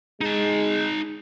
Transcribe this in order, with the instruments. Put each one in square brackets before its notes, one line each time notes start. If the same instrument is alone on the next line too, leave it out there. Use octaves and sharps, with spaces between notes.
[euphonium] G#3 [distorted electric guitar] D#4 A5